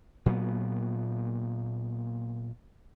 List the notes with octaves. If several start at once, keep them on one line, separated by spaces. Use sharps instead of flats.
A#2 F#3 A#3 B3